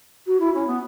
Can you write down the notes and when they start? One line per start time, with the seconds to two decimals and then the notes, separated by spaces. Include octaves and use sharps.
0.26 F#4
0.40 E4
0.54 C#4
0.67 B3